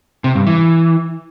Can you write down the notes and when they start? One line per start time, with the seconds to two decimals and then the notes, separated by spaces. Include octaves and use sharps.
0.24 C3
0.35 G2
0.47 E3